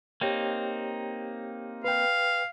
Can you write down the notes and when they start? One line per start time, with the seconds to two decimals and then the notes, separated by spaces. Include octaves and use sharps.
0.21 A#3 C4 D#4 G4 C#5 G5
1.84 B4 F5 G5